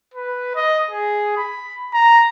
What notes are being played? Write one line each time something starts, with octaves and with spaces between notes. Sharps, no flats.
B4
D#5
G#4
B5
A#5